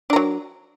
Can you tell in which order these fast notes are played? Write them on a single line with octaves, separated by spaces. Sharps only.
D4 A#4 F#3